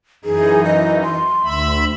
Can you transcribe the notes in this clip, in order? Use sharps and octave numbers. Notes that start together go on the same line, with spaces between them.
F#2 E3 D#4 G#4
D#5
C6
D2 E5 B5